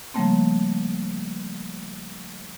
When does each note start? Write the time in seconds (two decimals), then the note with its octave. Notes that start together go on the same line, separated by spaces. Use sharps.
0.14 C#3 F3 G3 A3 A#3 C4